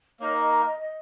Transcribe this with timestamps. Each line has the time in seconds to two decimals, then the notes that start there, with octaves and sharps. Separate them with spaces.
0.20 A#3 D#4 A#4 C#5
0.35 D#5
0.50 A#5
0.65 D#5
0.80 D#5